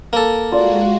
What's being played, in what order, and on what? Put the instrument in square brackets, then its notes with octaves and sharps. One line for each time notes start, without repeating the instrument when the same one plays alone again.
[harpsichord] A#3 A4
[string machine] G#3 F#4 [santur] F4 D5